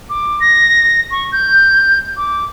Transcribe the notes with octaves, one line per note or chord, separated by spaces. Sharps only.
D6
A#6
C#6
G6
D6